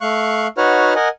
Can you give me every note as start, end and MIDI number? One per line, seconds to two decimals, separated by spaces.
0.01 0.47 57
0.01 0.47 77
0.01 0.47 85
0.01 0.47 90
0.57 0.94 63
0.57 0.94 66
0.57 0.94 71
0.57 0.94 73
0.57 0.94 78
0.57 0.94 89
0.95 1.09 70
0.95 1.09 75
0.95 1.09 78
0.95 1.09 80